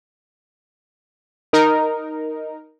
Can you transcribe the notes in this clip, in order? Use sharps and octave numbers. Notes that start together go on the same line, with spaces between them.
D#4 A#4